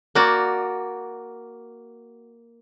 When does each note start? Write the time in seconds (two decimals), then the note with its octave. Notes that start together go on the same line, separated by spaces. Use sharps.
0.15 A#3 F#4 D5